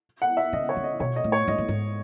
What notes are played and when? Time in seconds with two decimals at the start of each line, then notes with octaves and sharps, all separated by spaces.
0.22 F#5
0.37 E5
0.53 C#3 D#5
0.69 C#5
0.77 C#3
0.84 D#5
1.00 B2 C#5
1.16 D#5
1.24 A2
1.32 C#5
1.48 G#2 D#5
1.58 A2
1.68 G#2